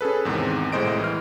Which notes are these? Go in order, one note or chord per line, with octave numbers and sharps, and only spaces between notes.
C#4 G#4 A4 B4
E2 G#2 C3 D#3
C2 A2 G#3 C5 D#5 D7
E3 F6